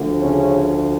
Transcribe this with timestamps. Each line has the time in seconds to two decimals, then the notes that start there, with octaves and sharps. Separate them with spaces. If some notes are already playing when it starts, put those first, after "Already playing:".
Already playing: D2 D3 F3
0.21 C#3 C#4